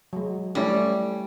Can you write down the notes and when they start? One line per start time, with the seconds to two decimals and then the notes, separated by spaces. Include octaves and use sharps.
0.13 F#3 G#3
0.55 G3 A3 C#4 E4